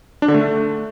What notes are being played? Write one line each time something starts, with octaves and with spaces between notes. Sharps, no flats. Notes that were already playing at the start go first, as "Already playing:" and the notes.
D4
D3
A3